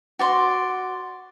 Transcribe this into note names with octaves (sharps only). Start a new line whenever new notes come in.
F#4 D5 C6